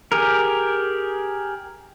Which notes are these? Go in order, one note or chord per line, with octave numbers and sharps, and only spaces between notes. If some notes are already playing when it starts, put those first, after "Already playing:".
G4 G#4 A#4